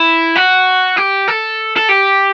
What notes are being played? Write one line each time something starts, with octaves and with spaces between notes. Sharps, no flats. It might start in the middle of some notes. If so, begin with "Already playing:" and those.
Already playing: E4
F#4
G4
A4
A4
G4